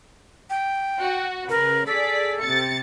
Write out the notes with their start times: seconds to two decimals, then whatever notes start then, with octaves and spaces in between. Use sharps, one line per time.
0.50 G5
1.00 F#4
1.49 C#3 A#4 B4
1.87 G#4 A4 D5 B6
2.40 C3 A6 C#7